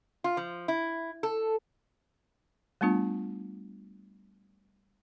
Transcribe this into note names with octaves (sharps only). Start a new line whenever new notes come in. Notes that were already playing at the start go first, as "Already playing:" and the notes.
F4
F3
E4
A4
G3 A3 B3 D4 F4